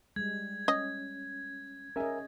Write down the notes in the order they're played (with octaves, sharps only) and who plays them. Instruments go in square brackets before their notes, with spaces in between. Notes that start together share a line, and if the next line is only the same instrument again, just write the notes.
[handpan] G3 G#3 [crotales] G#6
[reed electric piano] C#4 [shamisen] D#5
[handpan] C#4 G#4 D#5 [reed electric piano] A#4 E5 G#5